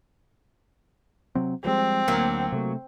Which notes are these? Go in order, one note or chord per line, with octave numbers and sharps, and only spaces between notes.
C3 F#3 C4
F3 G3 G#3 C4
D2 F#3 A#3
C3 A3